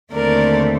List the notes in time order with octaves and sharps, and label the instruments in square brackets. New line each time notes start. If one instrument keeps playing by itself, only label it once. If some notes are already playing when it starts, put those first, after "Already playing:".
[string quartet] D#2 D3 A3 C4 A#4 D5